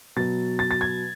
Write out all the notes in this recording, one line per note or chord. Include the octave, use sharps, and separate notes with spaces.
B2 F#3 A6
A6
A6
G#6